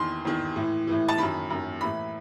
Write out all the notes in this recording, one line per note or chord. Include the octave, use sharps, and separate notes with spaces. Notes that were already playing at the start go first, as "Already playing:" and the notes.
Already playing: E2 D#3 C6
E2 D#3
A2 E3
A2 E3
A5
F#2 D#3 B5
F#2 D#3
A2 E3 B5